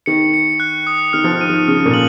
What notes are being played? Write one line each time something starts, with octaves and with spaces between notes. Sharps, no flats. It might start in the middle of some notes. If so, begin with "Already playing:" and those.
D#3 C#7
C#7
F#6
D#6
D#3 F6
F3
D#3
D#7
D#3
C#3 F6
A#2
F#7